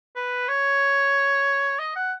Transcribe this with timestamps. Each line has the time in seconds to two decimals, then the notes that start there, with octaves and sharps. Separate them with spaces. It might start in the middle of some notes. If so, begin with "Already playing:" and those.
0.16 B4
0.48 C#5
1.79 D#5
1.96 F#5